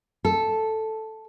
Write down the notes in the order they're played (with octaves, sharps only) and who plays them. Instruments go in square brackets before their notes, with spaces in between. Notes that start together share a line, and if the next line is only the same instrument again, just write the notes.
[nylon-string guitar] A4